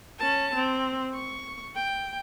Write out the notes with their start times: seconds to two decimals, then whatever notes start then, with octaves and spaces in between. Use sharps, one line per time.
0.19 C#4 A5
0.55 C4
1.15 C#6
1.76 G5